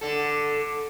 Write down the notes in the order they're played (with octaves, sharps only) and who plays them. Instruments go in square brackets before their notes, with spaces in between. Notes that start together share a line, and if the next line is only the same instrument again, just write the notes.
[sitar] D3 A4